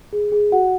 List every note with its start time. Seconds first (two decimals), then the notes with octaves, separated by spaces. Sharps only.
0.13 G#4
0.32 G#4
0.52 F#4 F#5